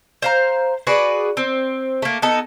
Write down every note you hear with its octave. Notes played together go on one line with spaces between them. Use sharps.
C5 F5 A#5
F#4 G#4 B4 D5
C4
A3 A#3
B3 D#4 A4